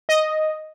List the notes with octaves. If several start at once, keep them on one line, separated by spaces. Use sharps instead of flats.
D#5